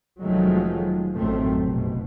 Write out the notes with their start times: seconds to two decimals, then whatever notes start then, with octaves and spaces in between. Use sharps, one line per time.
0.21 F1 D#3 F3 F#3 G#3 A3
1.14 A1 F#2 A2 D#3 A3 C4
1.65 F1 B2